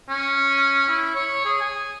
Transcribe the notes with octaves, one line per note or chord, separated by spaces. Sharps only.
C#4
E4
C#5
G#4
G#5